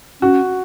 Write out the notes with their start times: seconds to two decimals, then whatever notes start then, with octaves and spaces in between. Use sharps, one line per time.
0.21 C#4 F#4